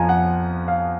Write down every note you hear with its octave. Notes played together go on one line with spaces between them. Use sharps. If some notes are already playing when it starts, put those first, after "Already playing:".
Already playing: F2 F3 G#5 A#5
F#5
F5